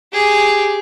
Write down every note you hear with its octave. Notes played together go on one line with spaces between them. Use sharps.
G4 G#4